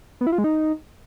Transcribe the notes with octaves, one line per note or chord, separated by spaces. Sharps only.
B3
E4
F4
G#3
D#4